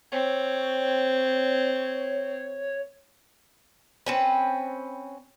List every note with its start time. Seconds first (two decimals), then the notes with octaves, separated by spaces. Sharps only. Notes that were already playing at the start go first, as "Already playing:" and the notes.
0.12 C4 C#5
4.06 C4 C#4 B4